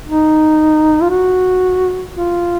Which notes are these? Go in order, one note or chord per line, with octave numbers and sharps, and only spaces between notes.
D#4
F4
F#4
F4